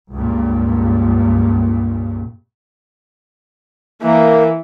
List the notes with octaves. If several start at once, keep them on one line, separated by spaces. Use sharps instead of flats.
C#2 G2 A#2
E3 A#3